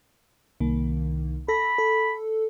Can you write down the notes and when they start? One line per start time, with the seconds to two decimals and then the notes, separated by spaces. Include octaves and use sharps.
0.60 C2 D#3 A#3
1.48 A4 B5 A#6
1.78 A4